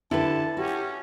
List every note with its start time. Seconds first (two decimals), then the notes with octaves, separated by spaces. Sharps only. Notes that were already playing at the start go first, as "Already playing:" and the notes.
0.11 D3 E4 G4 A4 B4 A5
0.57 C#4 F#4 G4